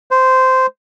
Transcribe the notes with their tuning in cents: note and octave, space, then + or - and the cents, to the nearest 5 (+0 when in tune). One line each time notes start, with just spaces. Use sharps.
C5 -10